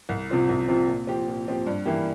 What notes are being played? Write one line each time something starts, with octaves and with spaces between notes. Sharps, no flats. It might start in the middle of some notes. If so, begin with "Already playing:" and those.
C2
C3 F3 C4 F4
C2
C3 F3 C4 F4
A#2
F3 C4 G4
A#2
F3 C4 G4
G2
E3 A#3 E4 G4